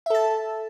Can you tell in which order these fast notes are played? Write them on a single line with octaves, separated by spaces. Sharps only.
E5 A4 A5